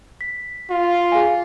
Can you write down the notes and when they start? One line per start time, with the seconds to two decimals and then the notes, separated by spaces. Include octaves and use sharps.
0.21 B6
0.70 F4
1.12 G#4 F5 G#5